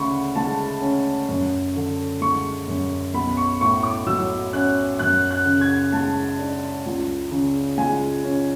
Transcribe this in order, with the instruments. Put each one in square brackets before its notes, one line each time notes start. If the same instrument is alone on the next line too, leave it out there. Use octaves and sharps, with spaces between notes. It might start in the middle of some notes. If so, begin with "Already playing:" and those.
Already playing: [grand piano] D2 C#3 B5 C#6
G#3 A5
C#4
F#2
D3
G#3 C#6
F#2
B1 B5
C#6
A2 C#6
D6
F#3 E6
C#4 F#6
F#2 F#6
F#6
C#3
G#6
G#3 A5
D4
C#2
C#3
G#3 G#5
C#4